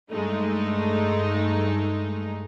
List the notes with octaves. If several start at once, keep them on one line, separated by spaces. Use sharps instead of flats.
G2 G#3 A3 D#4